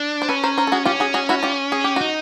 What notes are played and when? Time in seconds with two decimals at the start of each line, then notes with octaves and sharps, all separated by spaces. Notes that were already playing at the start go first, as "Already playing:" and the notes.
Already playing: D4
0.22 C5
0.29 C#4 A4 B4
0.43 A#4 C5
0.58 A#4 C5
0.67 A4
0.72 F#4 G#4
0.85 C#4 F4 G4
1.00 F#4 G#4
1.14 F#4 G#4
1.29 E4 F#4
1.43 F4 G4
1.72 G#4
1.84 G4
1.96 D#4 F#4